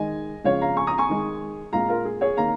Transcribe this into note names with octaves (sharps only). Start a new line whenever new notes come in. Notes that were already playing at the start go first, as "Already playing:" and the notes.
Already playing: D#3 G#3 D#5 G#5
C#3 F3 G#3 C#5 F5
F5 A#5
G#5 C#6
A#5 D#6
G#5 C#6
D#3 G#3
A#2 G#3 F5 A#5
F4 A#4
G#4
G#4 C#5
D#3 A#3 F5 A#5